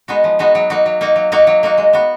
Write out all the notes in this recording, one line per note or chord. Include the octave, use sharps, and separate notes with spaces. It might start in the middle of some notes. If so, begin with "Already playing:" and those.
G#3 B3 D#4 F#4
F3
G#3 B3 D#4 F#4
F#3
A#3 D#4 F#4
F#3
A#3 D#4 F#4
F#3
A#3 D#4 F#4
F#3
A#3 D#4 F#4
G#3
B3 F#4